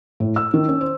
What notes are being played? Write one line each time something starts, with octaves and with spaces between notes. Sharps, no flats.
A2
E6
D#3
C#4
C5